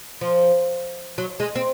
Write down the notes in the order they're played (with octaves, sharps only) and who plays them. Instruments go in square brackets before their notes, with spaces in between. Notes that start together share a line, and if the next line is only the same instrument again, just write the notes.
[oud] F3
F#3
G#3
C4